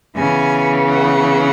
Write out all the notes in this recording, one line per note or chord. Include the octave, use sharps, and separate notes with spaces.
C#3 E3 B3 G#5
F#5